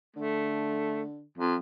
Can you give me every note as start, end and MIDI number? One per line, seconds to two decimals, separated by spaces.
0.16 1.24 50
0.16 1.02 57
1.38 1.56 41